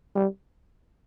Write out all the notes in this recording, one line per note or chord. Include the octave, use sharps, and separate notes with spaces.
G3